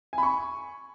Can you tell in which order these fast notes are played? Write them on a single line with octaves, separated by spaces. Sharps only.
G#5 B5 C#6